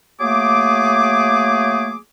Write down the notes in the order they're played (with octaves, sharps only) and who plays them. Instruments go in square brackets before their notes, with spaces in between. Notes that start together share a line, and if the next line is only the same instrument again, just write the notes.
[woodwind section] F#3 A3 A#3 G#4 D6